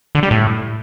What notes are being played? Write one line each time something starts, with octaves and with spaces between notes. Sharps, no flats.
D3
G3
A2